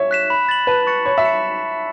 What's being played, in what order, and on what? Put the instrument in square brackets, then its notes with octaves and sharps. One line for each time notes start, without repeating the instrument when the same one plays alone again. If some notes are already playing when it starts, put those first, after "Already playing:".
Already playing: [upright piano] C#5 E5
[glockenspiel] F#6 B6 E7
B5
A6 F#7
[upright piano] B4 [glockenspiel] A5
[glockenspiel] C#6 A6 C#7
[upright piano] C#5 [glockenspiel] B5
[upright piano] E5
[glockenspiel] C#7 E7